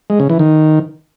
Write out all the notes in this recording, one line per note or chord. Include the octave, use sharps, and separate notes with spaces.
G#3
C#3
E3
D#3